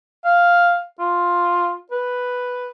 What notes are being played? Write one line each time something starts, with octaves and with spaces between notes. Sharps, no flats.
F5
F4
B4